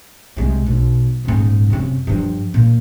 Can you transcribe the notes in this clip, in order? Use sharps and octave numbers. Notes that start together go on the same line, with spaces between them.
C2 G#3
B1
D#1 G#2
F#2 C3
G2 F3
A#2